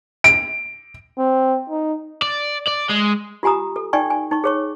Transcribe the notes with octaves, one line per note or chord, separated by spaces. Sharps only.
D7
C4
D#4
D5
D5
G#3
F4 G4 G#5 A#5 D#6
A4
D#4 D5 G5 G#5 C#6
G#5
D#4 C#6
G#4 C#5 C#6